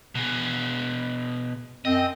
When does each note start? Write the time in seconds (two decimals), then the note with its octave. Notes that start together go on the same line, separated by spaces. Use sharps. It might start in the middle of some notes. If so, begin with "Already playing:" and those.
0.15 B2 G#4
1.85 F#2 C4 D#5